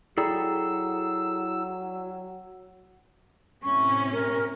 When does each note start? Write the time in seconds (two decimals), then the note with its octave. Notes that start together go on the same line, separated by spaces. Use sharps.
0.18 F#3 E4 G#4 A4 D5 G5 A#5 E6
3.63 A2 C3 C#4 C#6
4.13 A#4